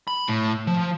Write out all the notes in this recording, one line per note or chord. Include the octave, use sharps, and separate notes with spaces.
B5
A2
F3